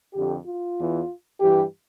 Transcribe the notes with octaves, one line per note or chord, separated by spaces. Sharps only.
F2 D3 G4
F4
E2 E3
G2 E3 G4